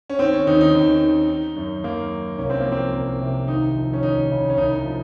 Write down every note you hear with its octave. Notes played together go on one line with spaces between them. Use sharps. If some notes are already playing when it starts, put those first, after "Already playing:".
C#4
D#3 C4
C#4
D#2 D#4
D#4
D#2
D#3
D#3
F#2
F#2 A#3
D#3
C2 C#4
C4
A#3
F3
C4
C2
C3
D#2 D#4
F3
C#4
D#2 D#4
C#3
C#4
C2 D#4
F3